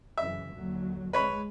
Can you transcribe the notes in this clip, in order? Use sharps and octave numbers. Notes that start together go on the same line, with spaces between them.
F#2 C#3 E3 E5
D#2 D3 F#3
G#3 B4 C#5 B5